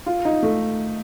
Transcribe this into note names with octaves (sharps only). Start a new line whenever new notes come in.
F4
D#4
A3